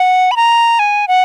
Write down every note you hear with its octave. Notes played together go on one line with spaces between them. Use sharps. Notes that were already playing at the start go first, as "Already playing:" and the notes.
Already playing: F#5
B5
A#5
G#5
F#5